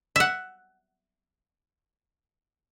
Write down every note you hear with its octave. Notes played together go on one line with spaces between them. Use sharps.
E5 F#5